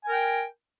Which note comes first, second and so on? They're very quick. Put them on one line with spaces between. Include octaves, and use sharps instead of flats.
G#5 A#4 G5